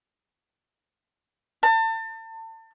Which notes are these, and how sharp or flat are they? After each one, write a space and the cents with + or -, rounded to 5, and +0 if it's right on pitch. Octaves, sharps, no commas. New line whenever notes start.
A5 +35